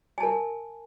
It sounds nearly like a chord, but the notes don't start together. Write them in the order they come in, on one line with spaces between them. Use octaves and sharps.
G#5 A5 A#4